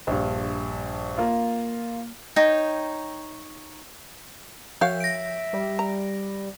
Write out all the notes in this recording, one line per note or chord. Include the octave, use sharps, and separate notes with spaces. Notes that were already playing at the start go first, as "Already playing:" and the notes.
A#1 G2
A#3 F4
D#4 C#5 G5
F3 F#4 C#5 E5 F5 G6
A#6 D7
G3
A#5